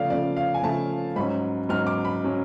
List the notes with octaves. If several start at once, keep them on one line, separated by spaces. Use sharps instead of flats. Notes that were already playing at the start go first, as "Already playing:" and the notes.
Already playing: C#3 F3 A3 D5 F5
C#3 F3 A3 D5
F5
G#5
C#3 F3 A3 A5
G#2 F#3 C#4 B5
G#2 F#3 C#4 F6
D6
B5
F#3 C#4